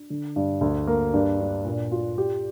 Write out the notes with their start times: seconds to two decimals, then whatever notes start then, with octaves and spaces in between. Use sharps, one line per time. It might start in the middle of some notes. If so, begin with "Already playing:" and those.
Already playing: D4
0.10 D3
0.36 G2
0.61 D2
0.87 A#3
1.13 G2
1.40 D4
1.65 A#2
1.92 F4
2.18 G4